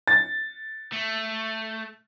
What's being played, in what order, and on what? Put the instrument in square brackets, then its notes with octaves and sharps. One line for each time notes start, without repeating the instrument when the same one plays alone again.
[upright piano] A6
[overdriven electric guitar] A3